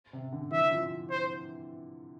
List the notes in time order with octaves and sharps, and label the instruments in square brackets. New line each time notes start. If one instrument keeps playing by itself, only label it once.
[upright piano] C3
D3
[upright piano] E3 [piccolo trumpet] E5
[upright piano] F3
[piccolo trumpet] C5